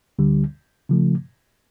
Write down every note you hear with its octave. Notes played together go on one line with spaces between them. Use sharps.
D2 D3 G3
C#3 F3 A3